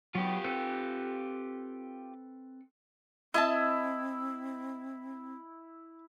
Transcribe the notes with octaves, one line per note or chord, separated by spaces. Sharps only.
F#3 B3 F4 G4
C4 A4 B4
C4 E4 D#5 E5 A5